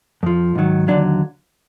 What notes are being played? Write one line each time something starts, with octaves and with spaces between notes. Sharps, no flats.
F2 F3
G#2 D#3 F#3
D#2 D3 F#3 D4